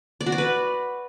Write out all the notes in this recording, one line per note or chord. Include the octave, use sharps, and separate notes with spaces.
D5
F#4
D5
B4